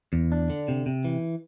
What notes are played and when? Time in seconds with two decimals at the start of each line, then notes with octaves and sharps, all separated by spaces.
0.13 E2
0.32 D4
0.50 D3
0.68 C3
0.86 C3
1.04 E3